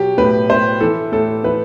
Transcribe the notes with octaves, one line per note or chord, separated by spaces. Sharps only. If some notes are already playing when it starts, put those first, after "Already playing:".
Already playing: B2 F#3 G4
A2 B4
A2 C5
E3 A4
A2 A4
E3 B4